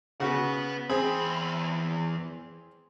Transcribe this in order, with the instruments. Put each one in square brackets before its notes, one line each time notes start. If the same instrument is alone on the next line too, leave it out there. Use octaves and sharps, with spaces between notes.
[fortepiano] C#3 F#4 [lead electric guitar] B4 F#5
[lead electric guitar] E2 B5 [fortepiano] C4 G#4